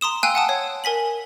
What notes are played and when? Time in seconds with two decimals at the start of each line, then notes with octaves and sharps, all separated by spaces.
0.01 A#5 C6 D#6 E7
0.23 F5 G5 G#5 E6 F#6 D#7
0.35 F#5 A5 D#6
0.49 C#5
0.84 A#4 G#5 B6 F#7